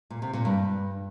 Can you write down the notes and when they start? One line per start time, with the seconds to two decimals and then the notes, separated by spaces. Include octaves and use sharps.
0.10 A#2
0.22 C3
0.33 A#2
0.45 G2